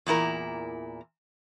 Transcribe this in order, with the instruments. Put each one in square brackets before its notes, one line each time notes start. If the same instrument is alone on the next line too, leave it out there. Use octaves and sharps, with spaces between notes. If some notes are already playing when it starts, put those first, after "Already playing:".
[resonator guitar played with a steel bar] E2 A#2 E4 A#4